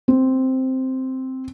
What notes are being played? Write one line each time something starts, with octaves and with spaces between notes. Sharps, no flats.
C4